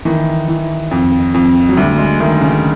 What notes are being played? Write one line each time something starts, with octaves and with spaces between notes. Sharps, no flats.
D#3 E3
E3
F2
F2
F#3
D2 G3
G#3
D2 D#3
C#3